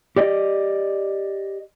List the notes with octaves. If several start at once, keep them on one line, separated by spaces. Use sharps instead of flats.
G4 D5 D#5